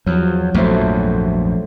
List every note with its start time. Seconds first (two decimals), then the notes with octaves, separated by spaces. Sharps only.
0.07 E2 F3 F#3
0.54 A#1 F2 G#2 F#3 A3 C5